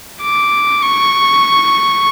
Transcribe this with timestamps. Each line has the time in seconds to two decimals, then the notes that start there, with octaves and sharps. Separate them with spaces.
0.22 D6
0.82 C#6